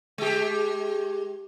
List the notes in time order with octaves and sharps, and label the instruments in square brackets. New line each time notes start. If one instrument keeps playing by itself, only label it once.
[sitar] G#3 G4